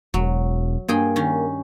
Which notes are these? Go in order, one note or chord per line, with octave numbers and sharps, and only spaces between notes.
E1 F#3
G2 A#3 G#4 G5
D#3 C#4